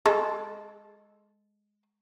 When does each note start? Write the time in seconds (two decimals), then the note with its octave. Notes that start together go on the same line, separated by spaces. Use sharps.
0.06 G#3 A4